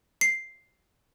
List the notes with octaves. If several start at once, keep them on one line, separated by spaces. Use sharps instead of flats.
C7